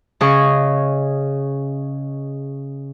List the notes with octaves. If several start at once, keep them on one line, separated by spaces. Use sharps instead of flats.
C#3 C#4 G#4 D#5 C#6